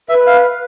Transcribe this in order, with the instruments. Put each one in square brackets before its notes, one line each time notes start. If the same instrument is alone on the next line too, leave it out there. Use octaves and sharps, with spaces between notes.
[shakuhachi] B4 [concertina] E5
[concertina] F5